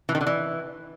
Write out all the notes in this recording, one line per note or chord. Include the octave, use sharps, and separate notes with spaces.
E3
D#3
D3
E3